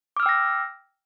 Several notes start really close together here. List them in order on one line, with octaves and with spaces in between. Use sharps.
D6 F6 E6 G5 A#6